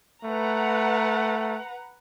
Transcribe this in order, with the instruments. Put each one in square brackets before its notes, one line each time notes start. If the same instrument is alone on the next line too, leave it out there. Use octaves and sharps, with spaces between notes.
[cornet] A3 [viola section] B4 F#5 A#5